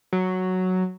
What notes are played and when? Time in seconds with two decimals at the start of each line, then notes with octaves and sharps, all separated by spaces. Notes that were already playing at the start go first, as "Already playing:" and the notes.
0.13 F#3